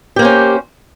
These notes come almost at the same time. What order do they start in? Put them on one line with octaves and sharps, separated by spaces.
G4 A#3 C5 C#4